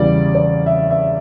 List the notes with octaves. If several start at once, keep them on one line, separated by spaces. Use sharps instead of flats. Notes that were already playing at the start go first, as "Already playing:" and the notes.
Already playing: E2 C#3 E3 G3 D5
D5
E5
E5